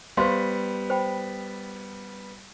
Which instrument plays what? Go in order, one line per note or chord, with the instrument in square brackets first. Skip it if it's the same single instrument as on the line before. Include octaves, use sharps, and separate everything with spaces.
[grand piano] G3 B3 [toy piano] G4 C5 F5 C6
[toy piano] C5 G5 B5